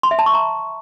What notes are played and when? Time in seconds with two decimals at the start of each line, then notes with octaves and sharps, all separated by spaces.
0.03 C6
0.11 E5
0.19 A5
0.26 C#6
0.34 A#5